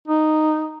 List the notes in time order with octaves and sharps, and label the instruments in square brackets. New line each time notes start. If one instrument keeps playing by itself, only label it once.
[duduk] D#4